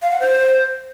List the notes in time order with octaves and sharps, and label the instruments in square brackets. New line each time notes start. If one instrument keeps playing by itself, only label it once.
[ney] F5
F#5
C5